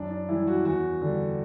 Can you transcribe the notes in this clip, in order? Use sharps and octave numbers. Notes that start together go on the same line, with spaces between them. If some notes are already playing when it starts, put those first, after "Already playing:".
Already playing: F#2 D4
D4
E3 G3 E4
F#4
E2 F#4
D3 G3